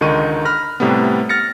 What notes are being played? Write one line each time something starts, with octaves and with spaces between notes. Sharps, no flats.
C#2 D3 D#3 D#4 C#6 D#7
B5 F6 F#6 A#6
A2 C3 G3 A3 B3
F6 A6 A#6 C#7